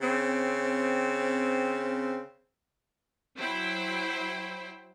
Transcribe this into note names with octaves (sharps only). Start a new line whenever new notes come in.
C#3 C4
F#3 E4 C5 G5